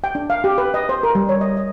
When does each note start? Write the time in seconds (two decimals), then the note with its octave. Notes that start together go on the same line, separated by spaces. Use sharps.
0.04 G5
0.15 D4
0.30 F5
0.44 G4
0.58 B4
0.74 D#5
0.89 C5
1.03 A#4
1.15 G3
1.29 C#5
1.41 D#5
1.57 D#5